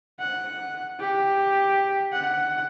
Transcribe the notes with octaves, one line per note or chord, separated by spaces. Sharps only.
F#5
G4
F#5